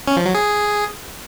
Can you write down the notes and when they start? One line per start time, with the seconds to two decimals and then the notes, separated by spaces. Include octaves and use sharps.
0.07 C#4
0.16 F3
0.25 F#3
0.34 G#4